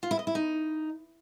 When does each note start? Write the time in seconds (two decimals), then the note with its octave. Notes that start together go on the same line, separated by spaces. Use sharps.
0.03 F4
0.11 E4
0.19 D#5
0.27 E4
0.35 D#4